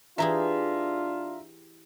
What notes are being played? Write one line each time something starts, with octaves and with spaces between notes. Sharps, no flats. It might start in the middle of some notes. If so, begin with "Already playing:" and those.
E3 D4 F4 G4 G#4 E5 A#5